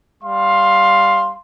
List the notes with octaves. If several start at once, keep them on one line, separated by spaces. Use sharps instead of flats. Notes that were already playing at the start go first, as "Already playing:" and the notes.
G3 F5 C6